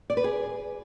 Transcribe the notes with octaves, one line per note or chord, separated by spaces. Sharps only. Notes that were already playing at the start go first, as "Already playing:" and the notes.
D5
B4
G#4